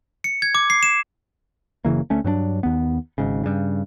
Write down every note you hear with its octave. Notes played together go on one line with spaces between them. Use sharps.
C#7
G#6
D6
C7
E7
F#1 C#3 E3 A#3
D2 A3 C#4
G2 F#3 C4 D4
D#2 B3
G#1 G#2 C#3
G2 C#3